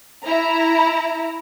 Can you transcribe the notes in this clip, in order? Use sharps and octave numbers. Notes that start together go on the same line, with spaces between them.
E4 A#5